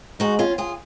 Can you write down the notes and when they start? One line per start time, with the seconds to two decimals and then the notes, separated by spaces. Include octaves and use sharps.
0.20 G#3 D#4 F#4
0.39 C#4 F4
0.58 F4 G#4